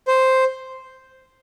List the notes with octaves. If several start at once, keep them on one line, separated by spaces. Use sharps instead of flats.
C5